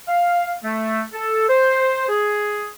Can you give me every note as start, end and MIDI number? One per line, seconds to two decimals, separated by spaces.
0.08 0.53 77
0.63 1.03 57
1.13 1.46 69
1.49 2.09 72
2.09 2.68 68